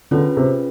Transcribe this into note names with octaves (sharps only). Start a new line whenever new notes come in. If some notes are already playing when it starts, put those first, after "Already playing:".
D3 C#4 F4 G#4 B4
C3